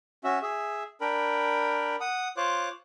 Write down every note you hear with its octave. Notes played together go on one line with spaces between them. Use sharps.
C#4 F#4 E5
G#4 E5
D4 A#4 G5 B5
F#5 D#6
F4 C5 C#5 D6 F#6